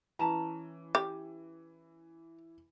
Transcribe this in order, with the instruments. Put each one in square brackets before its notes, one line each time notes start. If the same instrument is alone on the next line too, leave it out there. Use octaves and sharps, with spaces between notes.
[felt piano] E3 [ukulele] C#4 A5 A#5
[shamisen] G4